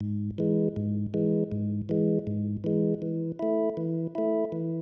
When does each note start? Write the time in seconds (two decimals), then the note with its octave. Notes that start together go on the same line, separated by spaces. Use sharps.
0.01 G#2
0.38 E3 G#3
0.76 G#2
1.14 E3 G#3
1.52 G#2
1.89 E3 G#3
2.27 G#2
2.64 E3 G#3
3.02 E3
3.39 A3 E4
3.77 E3
4.15 A3 E4
4.52 E3